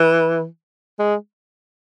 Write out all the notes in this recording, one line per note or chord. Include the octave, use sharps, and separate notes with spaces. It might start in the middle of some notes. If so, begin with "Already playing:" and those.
Already playing: E3
G#3